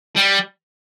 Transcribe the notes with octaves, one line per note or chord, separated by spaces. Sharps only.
G3